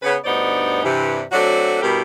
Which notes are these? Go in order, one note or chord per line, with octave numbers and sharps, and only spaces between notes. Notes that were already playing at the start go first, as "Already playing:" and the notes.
C#3 B3 B4
D2 G2 B3 D#4 C5 D5
G2 C3 E3
F#3 A3 C4 D4 F#4
G2 B2 G3 E4 G4 A#4